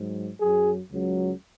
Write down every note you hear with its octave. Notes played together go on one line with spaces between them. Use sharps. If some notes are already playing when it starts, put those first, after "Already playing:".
Already playing: G#2 F#3
F#2 F#3 G#4
C#2 C#3 F#3